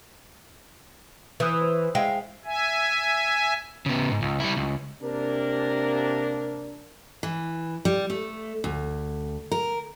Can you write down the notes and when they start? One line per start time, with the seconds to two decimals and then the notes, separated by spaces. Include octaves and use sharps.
1.40 E3 D#6 E6 G6
1.61 C5
1.95 G#3 E5 F5 G5
2.45 E5 G#5
3.86 C#3 B3
4.10 G#2
4.22 C#2
4.40 G3 E4
4.57 C#2
5.02 C3 A#3 D4 A#4
7.23 E3
7.85 G3
8.10 A3
8.64 D2
9.52 A#4